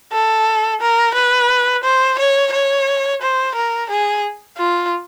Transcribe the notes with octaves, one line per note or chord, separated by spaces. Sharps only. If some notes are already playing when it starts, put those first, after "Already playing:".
A4
A#4
B4
C5
C#5
C#5
C5
A#4
G#4
F4